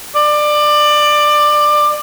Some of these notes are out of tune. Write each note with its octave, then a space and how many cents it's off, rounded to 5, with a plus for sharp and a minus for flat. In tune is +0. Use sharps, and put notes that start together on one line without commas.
D5 +20